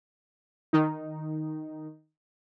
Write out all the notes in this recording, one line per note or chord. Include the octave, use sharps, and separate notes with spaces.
D#3 D#4